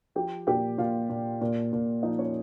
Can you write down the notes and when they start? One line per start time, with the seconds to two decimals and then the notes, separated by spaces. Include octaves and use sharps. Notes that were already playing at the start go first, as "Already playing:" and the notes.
0.15 F3 G4 G5
0.47 A#2 G4 G5
0.78 A#2 F4 F5
1.10 A#2
1.41 A#2
1.73 A#2
2.03 F3 D#4 D#5
2.19 C#4 C#5